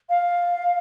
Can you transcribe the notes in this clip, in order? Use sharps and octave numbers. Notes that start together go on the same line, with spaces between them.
F5